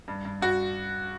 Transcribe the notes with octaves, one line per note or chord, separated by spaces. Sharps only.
G2
G2
G2 F#4